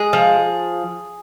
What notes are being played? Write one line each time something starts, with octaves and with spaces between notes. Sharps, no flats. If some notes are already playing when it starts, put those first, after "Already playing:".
Already playing: G#3 G#4
F3